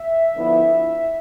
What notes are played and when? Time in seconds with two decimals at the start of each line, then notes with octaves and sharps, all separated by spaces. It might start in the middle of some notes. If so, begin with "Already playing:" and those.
Already playing: E5
0.35 D3 F3 B3 E4